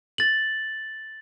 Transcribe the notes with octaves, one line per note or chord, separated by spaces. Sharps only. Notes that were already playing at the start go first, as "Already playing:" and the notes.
A6 F#7